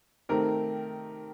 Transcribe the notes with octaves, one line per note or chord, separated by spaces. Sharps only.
D#3 A3 C4 G4 A#4